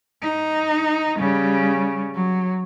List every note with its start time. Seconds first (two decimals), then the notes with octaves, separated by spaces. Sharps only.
0.22 D#4
1.18 C#3 G3
2.14 F#3